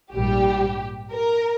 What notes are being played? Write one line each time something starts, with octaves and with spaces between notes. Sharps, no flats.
A#1 G#2 G3 G4
A#4